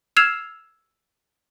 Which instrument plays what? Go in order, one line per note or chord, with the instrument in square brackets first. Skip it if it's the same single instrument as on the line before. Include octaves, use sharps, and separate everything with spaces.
[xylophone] E6 F6 G#6 C7 E7 F7